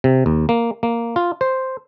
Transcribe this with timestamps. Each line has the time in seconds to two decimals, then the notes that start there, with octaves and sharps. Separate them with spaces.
0.04 C3
0.26 D#2
0.49 A#3
0.83 A#3
1.16 F4
1.41 C5